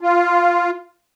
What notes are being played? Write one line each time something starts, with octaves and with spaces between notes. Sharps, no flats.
F4